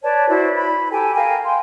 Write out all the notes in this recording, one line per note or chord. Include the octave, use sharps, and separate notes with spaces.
B4 C#5 D5 A5
E4 F#4 C5 D5
B5
G4 A4 G5 G#5
A#4 F5 G5 G#5
G5 C6